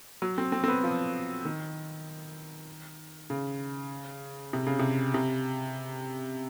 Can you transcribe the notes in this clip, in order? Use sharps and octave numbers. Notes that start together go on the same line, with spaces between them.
F#3
C4
C4
C4
B3
F3
D#3
C#3
C3
C#3
C3
C3